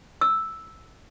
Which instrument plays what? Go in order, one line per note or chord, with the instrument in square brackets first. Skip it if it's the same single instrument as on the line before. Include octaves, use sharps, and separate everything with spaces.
[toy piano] E6